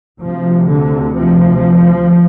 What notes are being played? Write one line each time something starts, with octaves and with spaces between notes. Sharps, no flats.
D2 C3 F3
D3
F3